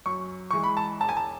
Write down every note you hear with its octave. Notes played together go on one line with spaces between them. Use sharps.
F#2 C#6
E3 G#3 C#6
B5
A5
E1 A5
G#5
A5